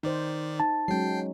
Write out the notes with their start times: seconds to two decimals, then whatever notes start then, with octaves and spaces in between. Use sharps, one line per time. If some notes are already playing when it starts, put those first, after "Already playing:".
0.03 D#3 D#4 C5 D5
0.60 D#4 A5
0.88 F#3 G#3 C#4 G5 C7